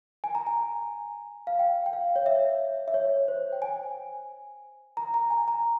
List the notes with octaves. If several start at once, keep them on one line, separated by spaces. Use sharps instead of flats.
G#5
A#5
G#5
F5
G5
G5
F5
C#5
E5
E5
C#5
C5
G5
G#5
A#5
A#5
G#5
A#5